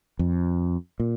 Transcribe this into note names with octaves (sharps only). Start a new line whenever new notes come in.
F2
A#2